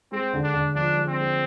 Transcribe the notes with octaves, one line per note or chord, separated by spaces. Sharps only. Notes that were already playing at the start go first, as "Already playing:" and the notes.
G#3 C4
D3
D4
D3
F3 D4
G#3
C4
G#3